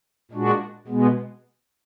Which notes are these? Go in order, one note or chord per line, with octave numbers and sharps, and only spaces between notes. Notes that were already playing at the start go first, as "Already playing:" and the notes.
A#2 G#3 D4 F#4
B2 G#3 B3